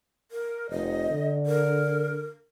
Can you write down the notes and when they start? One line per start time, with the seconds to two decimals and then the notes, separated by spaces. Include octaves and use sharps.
0.32 A#4
0.70 F1 D#5
1.11 D3
1.46 A#4